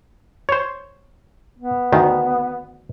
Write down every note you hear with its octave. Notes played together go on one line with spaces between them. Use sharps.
C5 C#5
B3
D2 D#3